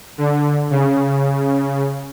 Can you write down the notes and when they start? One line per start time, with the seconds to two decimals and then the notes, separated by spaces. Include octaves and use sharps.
0.18 D3
0.71 C#3